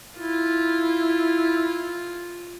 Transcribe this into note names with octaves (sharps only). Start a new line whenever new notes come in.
E4 F4